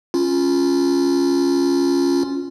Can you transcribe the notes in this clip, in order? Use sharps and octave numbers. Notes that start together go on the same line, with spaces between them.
C#4 F4